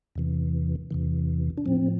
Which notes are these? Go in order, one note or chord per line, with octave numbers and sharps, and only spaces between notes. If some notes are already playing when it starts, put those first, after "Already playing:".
E2 C3 E3
E2 C3 E3
D4
A2 F3 C4